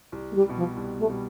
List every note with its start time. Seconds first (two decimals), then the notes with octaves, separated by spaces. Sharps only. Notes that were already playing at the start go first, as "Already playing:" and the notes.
0.12 C2
0.31 A3
0.35 G3
0.45 B2 G3
0.56 F3
0.77 C2
0.99 A3
1.09 B2 G3